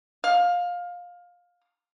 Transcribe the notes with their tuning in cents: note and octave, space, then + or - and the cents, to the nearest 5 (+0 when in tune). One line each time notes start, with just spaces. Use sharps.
F5 +20